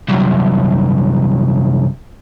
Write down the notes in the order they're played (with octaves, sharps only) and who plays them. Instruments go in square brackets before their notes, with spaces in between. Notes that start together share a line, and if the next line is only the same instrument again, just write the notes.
[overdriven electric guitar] C2 F#2